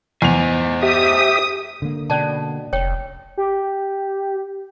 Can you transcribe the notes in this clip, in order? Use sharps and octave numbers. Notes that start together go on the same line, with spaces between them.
E2 C5 D#5 G#5 F7
G4 E5 D#6
D3 A#3
B2 C#4 D5 A5
F1 C#5 G5
G4